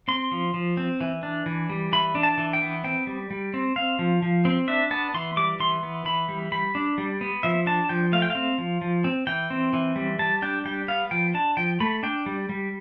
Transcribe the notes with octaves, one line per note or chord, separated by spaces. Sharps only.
C4 C6
F3
F3
C4
E3
D4
E3
G3
E3 B5
D4
A5
E3
G5
B3
C4 G5
G3
G3
C4
C4 F5
F3
F3
C4
D4 E5
B3 A5
E3 C6
G3 D6
E3 C6
B3
E3 B5
G3
G3 B5
D4
G3
B3
F3 E5
D4 A5
F3 G5
A3 F5
G5
C4 F5
F3
F3
C4
E3 G5
C4
E3
G3
G3 A5
D4 G5
G3 G5
B3 F5
F3 G5
D4 A5
F3 G5
A3 B5
D4 G5
G3
G3